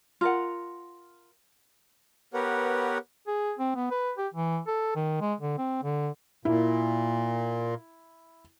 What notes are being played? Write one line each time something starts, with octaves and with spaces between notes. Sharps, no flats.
F4 A#4 F#5
B3 G4 A#4 B4 C#5 F#5
G#4
C4
B3
B4
G4
E3
A4
D#3
G#3
D3
C4
D3
A#2 E4